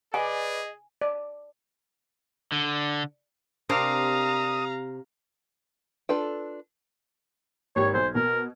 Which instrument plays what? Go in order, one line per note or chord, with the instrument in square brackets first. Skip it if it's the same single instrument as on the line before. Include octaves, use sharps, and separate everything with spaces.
[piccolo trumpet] G#4 [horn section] B4 D5 [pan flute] D#5 [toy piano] G#5
[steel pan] D5
[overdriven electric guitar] D3
[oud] C3 [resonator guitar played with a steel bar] D4 A#4 C5 [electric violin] F5 A#5 [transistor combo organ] D#6
[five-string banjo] D4 F4 A4 B4 G5
[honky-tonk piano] G#1 G4 G#6 [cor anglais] C#5
[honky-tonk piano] B1 [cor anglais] C5
[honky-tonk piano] B2 [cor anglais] A#4